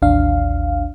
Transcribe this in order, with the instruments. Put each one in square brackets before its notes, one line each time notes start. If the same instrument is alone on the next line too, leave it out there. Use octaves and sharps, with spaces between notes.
[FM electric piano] A1 D#2 D4 F5